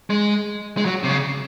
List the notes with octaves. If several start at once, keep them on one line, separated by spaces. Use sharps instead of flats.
G#3
G#3
F#3
C3
C#3